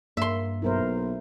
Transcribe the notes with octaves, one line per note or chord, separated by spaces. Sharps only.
G2 A#3 E5 C6
B1 E4 A#4 C5